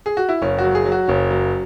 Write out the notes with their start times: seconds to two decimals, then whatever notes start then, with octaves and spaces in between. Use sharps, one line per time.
0.06 G#4
0.17 F#4
0.29 E4
0.42 F#1 C#4
0.58 F#4
0.64 F#3
0.75 G#4
0.85 F#3
0.92 F#4
1.07 F#1 C#4
1.31 F#3